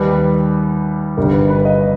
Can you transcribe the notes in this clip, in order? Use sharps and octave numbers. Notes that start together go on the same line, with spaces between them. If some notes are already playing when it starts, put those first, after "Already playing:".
Already playing: D#2 D#3 G3 B4
G1 G2 G3 A#4
B4
B4
D#5